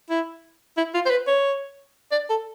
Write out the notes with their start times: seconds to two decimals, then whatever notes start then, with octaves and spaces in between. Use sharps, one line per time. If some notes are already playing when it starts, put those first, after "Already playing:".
0.10 E4
0.77 E4
0.94 F4
1.06 C5
1.10 B4
1.27 C#5
2.12 D5
2.30 A4